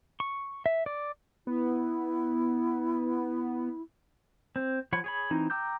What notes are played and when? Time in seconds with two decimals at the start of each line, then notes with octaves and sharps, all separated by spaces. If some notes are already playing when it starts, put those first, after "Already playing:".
0.20 C#6
0.66 E5
0.86 D5
1.47 B3 E4
4.56 C4
4.93 F3 C#5 F#5 B5 C#6
5.04 G#4 C#5 B5
5.31 E3 C4 D#4
5.50 G5 A#5 D6 E6 G6